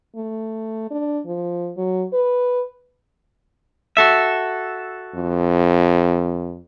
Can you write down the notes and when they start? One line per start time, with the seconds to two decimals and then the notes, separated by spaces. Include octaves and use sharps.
0.16 A3
0.91 D4
1.26 F3
1.77 F#3
2.13 B4
3.97 F#4 A4 E5
5.15 F2